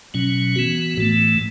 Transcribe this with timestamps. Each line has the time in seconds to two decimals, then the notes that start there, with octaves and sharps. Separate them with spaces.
0.14 B2 F#3 C#4
0.55 E3 B3 F#4
0.97 A2 E3 A3